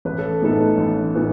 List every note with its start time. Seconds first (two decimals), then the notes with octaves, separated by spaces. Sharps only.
0.05 A1 B4
0.18 A4
0.42 A2 E3 B3 D#4 A4
0.78 A1
1.15 A2 E3 B3 D#4